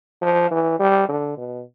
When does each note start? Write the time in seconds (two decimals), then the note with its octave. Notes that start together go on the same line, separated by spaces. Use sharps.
0.22 F3
0.51 E3
0.79 G3
1.09 D3
1.37 B2